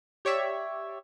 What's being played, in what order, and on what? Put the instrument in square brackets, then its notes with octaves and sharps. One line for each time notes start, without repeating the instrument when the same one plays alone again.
[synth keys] G4 C#5 D5 E5